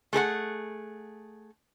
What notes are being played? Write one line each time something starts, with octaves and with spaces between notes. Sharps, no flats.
A3 G#4 A#4 F#5